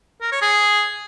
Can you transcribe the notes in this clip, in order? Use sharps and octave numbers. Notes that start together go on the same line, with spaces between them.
A#4
C#5
G#4